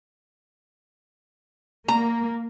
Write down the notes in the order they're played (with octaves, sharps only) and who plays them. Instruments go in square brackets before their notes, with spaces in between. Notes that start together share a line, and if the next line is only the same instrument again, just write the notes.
[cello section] A#3 [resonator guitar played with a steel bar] A#5